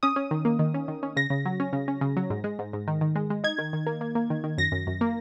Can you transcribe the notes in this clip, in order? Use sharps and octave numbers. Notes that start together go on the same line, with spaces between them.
C#4 D#6
C#4
D#3
A#3
D#3
C#4
D#3
C#4
C#3 A#6
C#3
F#3
C#4
C#3
C#4
C#3
F#3
G#2
G#3
G#2
G#2
D#3
D#3
G#3
G#3
D#4 G#6
D#3
D#3
A#3
A#3
A#3
D#3
D#3
F#2 A#6
F#2
F#2
A#3